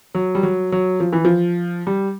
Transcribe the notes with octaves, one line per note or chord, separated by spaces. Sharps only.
F#3
G3
F#3
F#3
F3
E3
F3
G3